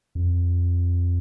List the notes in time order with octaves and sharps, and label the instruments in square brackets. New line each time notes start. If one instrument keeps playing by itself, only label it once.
[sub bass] F2